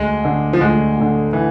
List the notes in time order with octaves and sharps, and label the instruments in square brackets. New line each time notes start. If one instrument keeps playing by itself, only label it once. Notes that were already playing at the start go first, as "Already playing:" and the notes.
Already playing: [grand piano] D2 [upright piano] G#3
[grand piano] D3 A3
[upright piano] F3
[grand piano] D2 [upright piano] G#3
[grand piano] D3 A3
[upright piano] E3